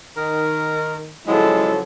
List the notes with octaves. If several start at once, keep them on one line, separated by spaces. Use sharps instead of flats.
D#3 A#4
C#3 F3 F#3 G#3 E4 A4